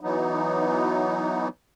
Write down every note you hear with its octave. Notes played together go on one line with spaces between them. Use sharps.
E3 F#3 B3 D#4